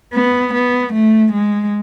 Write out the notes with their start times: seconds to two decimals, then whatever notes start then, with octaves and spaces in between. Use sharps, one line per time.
0.14 B3
0.54 B3
0.93 A3
1.33 G#3